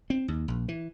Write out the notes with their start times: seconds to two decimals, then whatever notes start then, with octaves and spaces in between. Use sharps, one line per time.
0.10 C4
0.28 D#2
0.48 A#1
0.68 E3